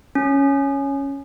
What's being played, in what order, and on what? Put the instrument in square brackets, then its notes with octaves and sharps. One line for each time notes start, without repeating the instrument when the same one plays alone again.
[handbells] C#4